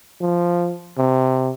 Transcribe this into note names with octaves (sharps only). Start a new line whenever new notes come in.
F3
C3